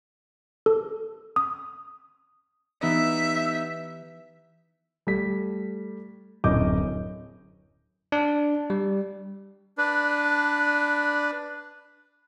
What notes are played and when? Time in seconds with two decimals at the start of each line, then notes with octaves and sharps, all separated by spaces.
0.66 A4
1.36 D#6
2.83 E3 B3 D#4 G4 B4 E5
5.07 G3 A3 B6
6.44 D1 F#2 E4 D#5 D6 G6
8.12 D4
8.70 G3
9.78 D4 B4